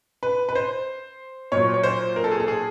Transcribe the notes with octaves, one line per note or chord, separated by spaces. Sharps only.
B4
B4
C5
A#2 F#3 C#5
C#5
C5
A#4
A4
G#4
A4
G#4